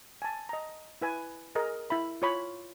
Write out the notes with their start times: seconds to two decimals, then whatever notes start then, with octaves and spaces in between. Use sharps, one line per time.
0.22 G#5 A5
0.49 D#5 A#5
1.01 E4 B4 G#5
1.55 G#4 A#4 D#5
1.90 E4 E5 B5
2.22 F4 C#5 B5